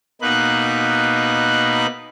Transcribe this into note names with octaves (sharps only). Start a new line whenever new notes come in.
B2 A#3 D#4 B4 F#6